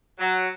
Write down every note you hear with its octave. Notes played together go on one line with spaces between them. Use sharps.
F#3